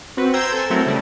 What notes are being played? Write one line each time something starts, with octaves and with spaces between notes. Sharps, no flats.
C4 F#4 B4
C5 G5 A#5 E6 G6 G#6
A4 C5 G#5
F#3 A3 C4 E4 A4 A#4
C#3 G3 A3